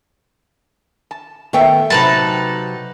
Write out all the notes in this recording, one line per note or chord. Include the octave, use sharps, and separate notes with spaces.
A5
D#3 A3 B3 A4 E5 G5
C3 F#3 D#4 B4 A5